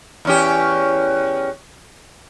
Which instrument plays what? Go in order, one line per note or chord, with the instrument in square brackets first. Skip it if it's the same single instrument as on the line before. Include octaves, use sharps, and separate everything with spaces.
[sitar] E2 C#4 G4